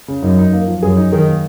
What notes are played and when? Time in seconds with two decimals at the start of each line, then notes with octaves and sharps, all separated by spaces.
0.08 C#3
0.23 F#2 D#4
0.39 D#4
0.53 A#3
0.67 F3
0.82 F#2 G#4
0.97 D#4
1.12 D#3 G#4
1.27 A#3